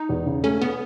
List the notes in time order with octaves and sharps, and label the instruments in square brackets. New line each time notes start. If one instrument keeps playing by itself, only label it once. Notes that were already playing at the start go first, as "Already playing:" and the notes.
Already playing: [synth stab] D#4
[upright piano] E2
C#3
[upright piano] A3 [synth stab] C#4
[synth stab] B3